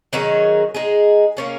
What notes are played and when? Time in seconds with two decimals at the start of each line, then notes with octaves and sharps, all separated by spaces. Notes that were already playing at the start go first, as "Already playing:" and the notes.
0.13 D#3 F#3 C#4 G#4
0.74 G#3 D#4 G#4
1.37 A#3 C#4 G#4